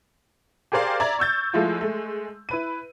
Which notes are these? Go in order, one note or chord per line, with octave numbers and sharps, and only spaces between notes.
G4 G#4 A#4 C5 D5 F5
D5 E5 A#5 G#6
C#6 E6 G6 A6
F3 G#3 A3 E4 F4
G#3 A3
E4 B4 D#7